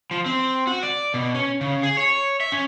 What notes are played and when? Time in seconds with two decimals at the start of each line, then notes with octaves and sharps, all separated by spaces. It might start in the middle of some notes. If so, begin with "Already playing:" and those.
0.11 F3
0.26 C4
0.67 F#4
0.83 D5
1.14 B2
1.35 C#4
1.61 C#3
1.83 G#4
1.97 C#5
2.40 E5
2.52 C#4